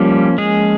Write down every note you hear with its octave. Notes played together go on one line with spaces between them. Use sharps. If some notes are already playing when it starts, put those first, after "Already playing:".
Already playing: F3 G3 A#3 C#4 G4
G#3 G#4